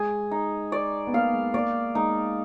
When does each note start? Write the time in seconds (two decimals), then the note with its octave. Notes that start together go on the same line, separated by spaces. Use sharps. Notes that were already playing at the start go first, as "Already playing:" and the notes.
Already playing: G#3 G#4
0.31 D#4
0.72 D5
1.07 B3
1.14 A#3 F5
1.33 G#3
1.54 A#3 D5
1.95 G#3 D#4